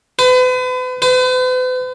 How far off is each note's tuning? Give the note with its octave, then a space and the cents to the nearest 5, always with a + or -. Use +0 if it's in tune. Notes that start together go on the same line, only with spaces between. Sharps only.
B4 +40
B4 +45